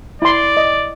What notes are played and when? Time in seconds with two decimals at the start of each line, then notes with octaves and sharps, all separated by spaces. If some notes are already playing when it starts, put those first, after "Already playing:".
0.22 E4 D5 C6
0.57 D#5